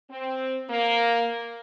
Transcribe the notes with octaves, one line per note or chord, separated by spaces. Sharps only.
C4
A#3